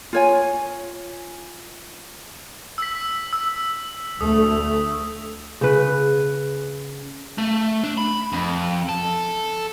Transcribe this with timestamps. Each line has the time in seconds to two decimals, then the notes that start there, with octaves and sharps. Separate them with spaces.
0.13 F4 C#5 G#5
2.78 E6 B6
3.33 E6
4.21 D2 A3 D#6
5.61 C#3 B4
7.38 A3
7.83 D4
7.98 B5
8.32 F2
8.89 A4